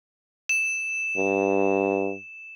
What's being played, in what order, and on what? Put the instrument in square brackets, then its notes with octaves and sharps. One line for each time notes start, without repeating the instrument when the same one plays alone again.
[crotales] E7
[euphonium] G2